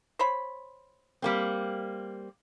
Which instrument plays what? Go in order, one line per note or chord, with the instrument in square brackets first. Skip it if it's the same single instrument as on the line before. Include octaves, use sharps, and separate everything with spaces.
[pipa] C5 C#5 B5
[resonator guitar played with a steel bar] G3 A#3 C4